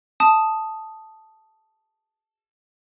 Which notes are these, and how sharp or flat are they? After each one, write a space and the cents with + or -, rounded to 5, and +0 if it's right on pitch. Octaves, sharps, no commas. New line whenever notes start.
A5 +0 D#6 +0